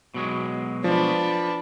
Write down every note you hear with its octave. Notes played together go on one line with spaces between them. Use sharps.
B2 F#3 G#3
F3 D4 B4